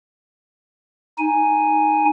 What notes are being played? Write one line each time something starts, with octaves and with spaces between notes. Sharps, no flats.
D#4 G#5